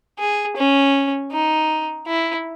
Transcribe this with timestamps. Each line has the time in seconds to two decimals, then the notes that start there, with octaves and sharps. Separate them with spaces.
0.19 G#4
0.57 C#4
1.31 D#4
2.07 E4